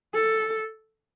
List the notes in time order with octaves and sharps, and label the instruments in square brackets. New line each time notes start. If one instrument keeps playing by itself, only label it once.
[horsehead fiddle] A4